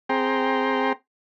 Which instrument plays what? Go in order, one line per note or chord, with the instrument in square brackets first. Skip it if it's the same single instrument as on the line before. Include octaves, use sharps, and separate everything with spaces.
[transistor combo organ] C4 G#4 G5 A#5 C6